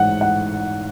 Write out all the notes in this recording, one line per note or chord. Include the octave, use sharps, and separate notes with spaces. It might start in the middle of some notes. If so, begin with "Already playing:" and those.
Already playing: A1 G#2 F#5
F#5